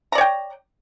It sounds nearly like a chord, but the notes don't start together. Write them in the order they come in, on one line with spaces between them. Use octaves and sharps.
A#5 D5 C#5 G5